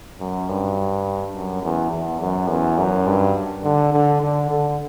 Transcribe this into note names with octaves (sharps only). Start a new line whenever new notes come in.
F#2
G2
F#2
E2
E2
F#2
E2
F#2
G2
D3
D3
D3
D3